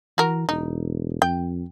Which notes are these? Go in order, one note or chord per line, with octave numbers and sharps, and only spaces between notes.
E3 F#4 A#4
E1 D#4
F2 G5